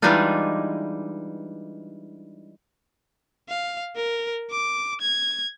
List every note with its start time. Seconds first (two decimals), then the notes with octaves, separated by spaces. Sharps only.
0.02 E3 G3 G#3 D4 D#4 F4
3.49 F5
3.96 A#4
4.51 D6
5.01 G#6